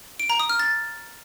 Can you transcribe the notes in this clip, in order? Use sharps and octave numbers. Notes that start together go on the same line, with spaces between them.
D7
A#5
D#6
F6
A6